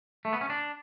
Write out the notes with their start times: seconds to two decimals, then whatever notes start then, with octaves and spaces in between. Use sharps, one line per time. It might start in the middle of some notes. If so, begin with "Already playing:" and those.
0.25 A3
0.33 B3
0.41 C#4
0.50 D4